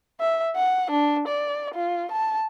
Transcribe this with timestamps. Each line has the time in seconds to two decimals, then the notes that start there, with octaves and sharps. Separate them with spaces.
0.20 E5
0.56 F#5
0.91 D4
1.28 D5
1.74 F4
2.11 A5